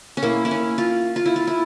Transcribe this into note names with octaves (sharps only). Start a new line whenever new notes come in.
C#4
A#3 E4
E4
C#4
F4
F4
E4
F4
E4